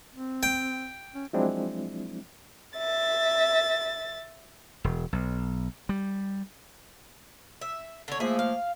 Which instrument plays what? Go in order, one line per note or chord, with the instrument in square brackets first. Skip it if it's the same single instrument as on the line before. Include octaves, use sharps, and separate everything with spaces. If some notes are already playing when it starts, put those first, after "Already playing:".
[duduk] C4
[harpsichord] G5
[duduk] C#4
[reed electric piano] F3 F#3 G#3 C4 D4 E4
[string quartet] E5 A6
[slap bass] E1
B1
G3
[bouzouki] E5
D3 C#5
[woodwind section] F3 A3 A#3 [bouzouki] G#4 E5
[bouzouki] F5